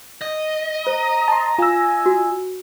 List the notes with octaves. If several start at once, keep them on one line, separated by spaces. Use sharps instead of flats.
D#5
C5 A#5
A5 C6
F4 G#5 A#5 E6
F#4